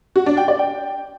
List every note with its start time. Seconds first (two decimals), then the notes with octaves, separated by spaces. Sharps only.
0.16 F#4
0.26 D4
0.37 G5
0.48 D5
0.59 G5